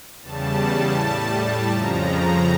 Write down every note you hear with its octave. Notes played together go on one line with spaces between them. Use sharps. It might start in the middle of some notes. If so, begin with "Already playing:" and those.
E2 C#3 G3 A5
A2 G3 A5
A5
F2 C#3 F3 A#5
A#5